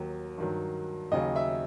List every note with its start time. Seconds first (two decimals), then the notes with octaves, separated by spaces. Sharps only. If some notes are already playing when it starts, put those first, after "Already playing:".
Already playing: D#2 D#3 F#3
0.38 G2 D#3 F#3
1.11 D#2 C#3 F#3 D#5
1.36 E5